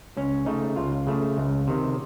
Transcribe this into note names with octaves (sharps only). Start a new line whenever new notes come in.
C#2 C#4
C#3 A3 D#4
C#2 F4
C#3 A3
C#2
C3 D#3